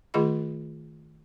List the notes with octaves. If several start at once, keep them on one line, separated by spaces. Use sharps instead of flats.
D#3 A3 F4 G#4 D#5 B5